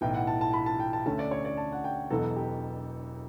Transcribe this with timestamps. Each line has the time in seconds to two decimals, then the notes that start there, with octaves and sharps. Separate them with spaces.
0.01 B1 A2 E3 G5
0.14 F#5
0.27 A5
0.41 A5
0.53 B5
0.66 A5
0.80 G5
0.93 A5
1.06 D2 D3 A3 C#4 A5
1.19 D5
1.31 C#5
1.45 D5
1.57 A5
1.72 F#5
1.84 G5
2.11 E1 E2 B2 F#3 A4
2.36 G4